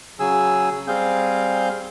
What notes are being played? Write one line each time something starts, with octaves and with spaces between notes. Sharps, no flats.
C#3 F#3 G#4 G#5 E6
G3 C4 G#4 F5 G6